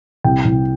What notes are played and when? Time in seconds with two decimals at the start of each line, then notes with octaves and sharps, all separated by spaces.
0.24 C2 G5
0.45 C2